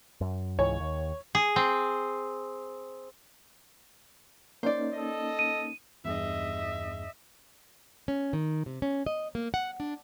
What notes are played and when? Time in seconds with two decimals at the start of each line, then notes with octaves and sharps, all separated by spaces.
0.21 F#2
0.59 C#2 G#2 E3 C#5
0.80 D#2
1.35 G#4
1.56 C4
4.63 A#3 C#4 D#4 C5 D5
4.94 A4 D#5
5.39 D#7
6.05 E2 G2 G#4 D#5 E5
8.08 C#4
8.33 D#3
8.66 C3
8.82 C#4
9.06 D#5
9.35 A#3
9.54 F#5
9.80 D4